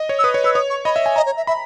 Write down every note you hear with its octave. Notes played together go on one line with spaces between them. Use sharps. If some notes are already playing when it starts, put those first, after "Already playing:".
Already playing: D#5
C#5
E6
B4 D#6
C#5
B4 E6
C#5 D#6
C#6
D#5 B5
E5
G#5
D#5 A#5
C#5
E5
E5 B5